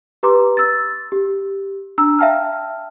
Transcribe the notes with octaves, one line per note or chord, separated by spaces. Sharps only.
G4 B4 A#5 C6 D6
E6 A6
G4
D4 A#5 E6
E5 F5 G5 A5 F6